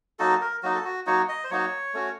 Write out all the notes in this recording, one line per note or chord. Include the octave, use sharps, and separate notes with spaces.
F#3 A#3 D#4 F#4 A4
A#4
F#3 A#3 D#4 F#4
A4
F#4
F#3 A#3 D#4 F#4 C#5
D#5
C5
F#3 A#3 D#4 F#4 C#5
A3 C#4 F#4